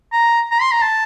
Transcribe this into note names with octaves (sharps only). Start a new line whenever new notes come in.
A#5
A#5
C6
A#5
A5